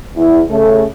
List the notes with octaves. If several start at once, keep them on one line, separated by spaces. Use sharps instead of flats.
E2 E4
C#3 A3 A4